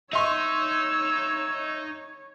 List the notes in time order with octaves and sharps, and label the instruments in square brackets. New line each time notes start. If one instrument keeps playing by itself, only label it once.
[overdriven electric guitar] D#4 [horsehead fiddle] C#5 [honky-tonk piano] E5 C6 C#6 [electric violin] E6